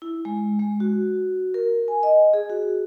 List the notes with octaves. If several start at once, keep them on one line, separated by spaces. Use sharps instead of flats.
E4
G#3
G#3
F#4
A#4
G#5
D#5
G#4
F#4